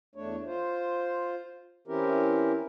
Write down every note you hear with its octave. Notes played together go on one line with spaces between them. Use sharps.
E2 A3 D4 C#5
F4 C5
E3 C4 C#4 E4 G4 A#4